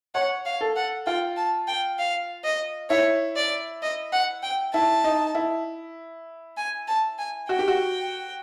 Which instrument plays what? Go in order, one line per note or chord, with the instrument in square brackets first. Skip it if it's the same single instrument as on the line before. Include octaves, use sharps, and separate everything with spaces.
[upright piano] C#5 [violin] F#5
[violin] F5
[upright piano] A4
[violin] F#5
[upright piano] F4 [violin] G5
[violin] A5
G5
F5
D#5
[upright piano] E4 [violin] C#5
[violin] D5
D#5
F#5
G5
[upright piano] E4 [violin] A5
[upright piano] D#4
E4
[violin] G#5
A5
G#5
[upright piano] F#4 [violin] G5
[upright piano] G4
F#4